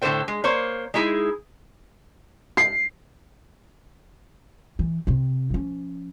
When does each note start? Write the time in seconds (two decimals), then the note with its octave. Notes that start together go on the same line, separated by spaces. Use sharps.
0.02 A2 D3 G4 A4 C5 G5
0.28 G#3
0.44 A#3 C5 C#5
0.94 G#3 D#4 E4 G#4
2.57 C7
4.79 E3
5.07 C3 C4
5.50 F3 C#4